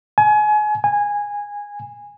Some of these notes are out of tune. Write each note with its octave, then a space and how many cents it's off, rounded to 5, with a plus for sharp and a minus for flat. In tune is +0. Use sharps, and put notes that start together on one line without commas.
G#5 +30
G#5 -15